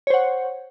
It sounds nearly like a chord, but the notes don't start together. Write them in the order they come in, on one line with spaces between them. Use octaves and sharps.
C#5 C5 F#5